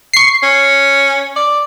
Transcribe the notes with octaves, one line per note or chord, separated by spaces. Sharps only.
C#6 C7
C#4
D5